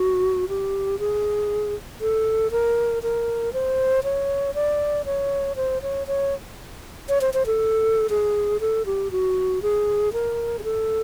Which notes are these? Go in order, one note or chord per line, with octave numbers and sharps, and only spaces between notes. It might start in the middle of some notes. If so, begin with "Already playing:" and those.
Already playing: F#4
G4
G#4
A4
A#4
A#4
C5
C#5
D5
C#5
C5
C#5
C#5
C#5
C5
C5
A4
G#4
A4
G4
F#4
G#4
A#4
G#4
A4